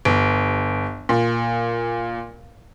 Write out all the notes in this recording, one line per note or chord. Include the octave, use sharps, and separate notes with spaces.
G1
A#2